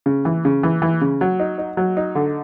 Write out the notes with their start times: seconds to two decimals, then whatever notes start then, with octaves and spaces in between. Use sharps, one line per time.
0.06 C#3
0.25 E3
0.45 C#3
0.63 E3
0.82 E3
1.01 C#3
1.21 F#3
1.40 D#4
1.58 D#4
1.77 F#3
1.97 D#4
2.15 D3